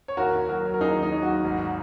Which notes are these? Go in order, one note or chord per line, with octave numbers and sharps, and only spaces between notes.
C#5
D#2 F#4 A#4
D#2
F#3 F#4 A#4
F#3
A#4
D#2 D#4 G#4
D#3
D#4
F#3
F#4
D#2
G#1